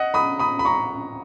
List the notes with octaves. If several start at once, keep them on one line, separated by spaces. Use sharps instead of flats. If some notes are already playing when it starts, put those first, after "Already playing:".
Already playing: D#5 F#5
B5 D#6
B5 D#6
B5
A#5 C#6